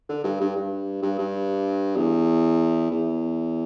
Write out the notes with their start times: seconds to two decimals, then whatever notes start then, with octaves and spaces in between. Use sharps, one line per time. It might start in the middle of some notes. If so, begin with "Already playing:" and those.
0.09 D3
0.24 G2
0.40 G2
0.56 G2
1.02 G2
1.18 G2
1.97 E2
2.91 E2